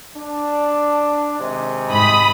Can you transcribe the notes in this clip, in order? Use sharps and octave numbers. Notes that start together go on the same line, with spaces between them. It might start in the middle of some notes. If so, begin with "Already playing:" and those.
D4
C3 D#3 G#3
G#2 B5 D#6